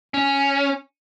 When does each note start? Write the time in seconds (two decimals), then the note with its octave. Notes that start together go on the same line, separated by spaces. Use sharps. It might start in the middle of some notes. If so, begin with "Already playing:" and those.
0.14 C#4